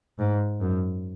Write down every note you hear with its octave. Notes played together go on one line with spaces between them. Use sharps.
G#2
F#2